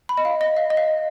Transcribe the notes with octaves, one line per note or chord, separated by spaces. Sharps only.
B5
D#5
F5
D#5
F5
D#5
F5